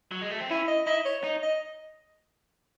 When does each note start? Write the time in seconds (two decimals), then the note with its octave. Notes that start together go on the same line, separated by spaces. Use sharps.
0.11 F#3
0.21 G#3
0.31 A3
0.40 C4
0.49 C#4 E4
0.68 D#5
0.86 E4 D#5
1.05 C#5
1.24 D#4
1.43 D#5